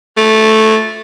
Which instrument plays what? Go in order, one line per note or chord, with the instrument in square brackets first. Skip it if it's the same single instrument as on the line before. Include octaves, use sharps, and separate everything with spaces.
[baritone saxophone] A3